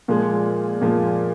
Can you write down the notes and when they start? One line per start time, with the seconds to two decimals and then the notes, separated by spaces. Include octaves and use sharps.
0.08 A#2 F3 G#3
0.81 A#2 F3 G#3